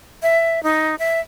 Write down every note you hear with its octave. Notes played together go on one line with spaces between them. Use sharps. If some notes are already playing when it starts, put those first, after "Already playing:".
E5
D#4
E5